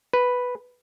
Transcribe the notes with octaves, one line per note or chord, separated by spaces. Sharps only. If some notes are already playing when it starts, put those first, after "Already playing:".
B4